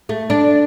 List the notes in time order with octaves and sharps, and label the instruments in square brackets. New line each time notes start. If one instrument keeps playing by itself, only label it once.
[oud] A3
D4